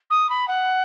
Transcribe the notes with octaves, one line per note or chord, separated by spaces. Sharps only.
D#6
B5
F#5